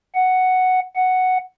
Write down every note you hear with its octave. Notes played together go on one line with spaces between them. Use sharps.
F#5
F#5